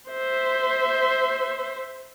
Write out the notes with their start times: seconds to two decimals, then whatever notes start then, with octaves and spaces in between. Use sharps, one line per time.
0.10 C5 E5